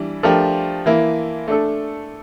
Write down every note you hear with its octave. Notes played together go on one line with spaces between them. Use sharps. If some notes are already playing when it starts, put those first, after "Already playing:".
Already playing: E3 G3 D4
F3 A3 D4 G4 A#4
E3 A#3 E4
A3 D4 A4